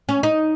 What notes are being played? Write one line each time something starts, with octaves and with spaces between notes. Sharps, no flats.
C#4
D#4